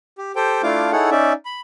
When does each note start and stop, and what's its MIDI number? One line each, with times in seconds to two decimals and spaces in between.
0.18 0.32 67
0.36 0.62 67
0.36 0.62 69
0.36 0.62 72
0.36 0.62 79
0.63 0.91 57
0.63 0.91 62
0.63 0.91 64
0.63 0.91 65
0.63 0.91 77
0.63 0.91 86
0.92 1.10 63
0.92 1.10 64
0.92 1.10 68
0.92 1.10 69
0.92 1.10 73
0.92 1.10 78
1.11 1.33 61
1.11 1.33 63
1.11 1.33 74
1.11 1.33 76
1.45 1.61 83